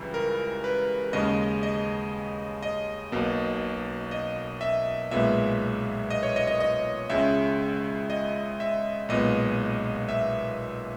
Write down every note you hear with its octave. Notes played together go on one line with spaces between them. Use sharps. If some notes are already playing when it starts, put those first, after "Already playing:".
Already playing: C#2 C#3 E3 G3
A#4
B4
D#2 C#3 G#3 C#4 D#5
D#5
D#5
B1 B2 A#3
D#5
E5
B1 A#2 G#3 B3 E5
D#5
C#5
D#5
D#5
D#5
C#2 C#3 G#3 C#4 E5
D#5
E5
B1 A#2 G#3 B3 D#5
E5